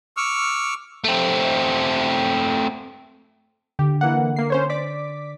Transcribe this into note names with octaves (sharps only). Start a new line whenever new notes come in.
C#6 D6 E6 F6
A3 C4
D3 G4
E3 A#3 F#5
A#3 C7
C#4 C5 C#5
D5 D6 B6